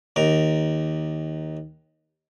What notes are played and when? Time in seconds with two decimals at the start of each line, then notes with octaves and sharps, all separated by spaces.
0.16 D#2 A#4